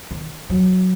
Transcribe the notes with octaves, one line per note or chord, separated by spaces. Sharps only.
D#3
F#3